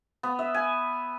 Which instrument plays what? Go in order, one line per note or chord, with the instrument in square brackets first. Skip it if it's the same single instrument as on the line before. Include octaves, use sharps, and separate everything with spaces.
[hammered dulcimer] B3
E5
G#5